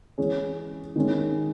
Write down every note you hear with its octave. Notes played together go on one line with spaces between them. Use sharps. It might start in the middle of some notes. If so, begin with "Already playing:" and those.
E3 G#3 C#4 G#4 C#5
D#3 G#3 C#4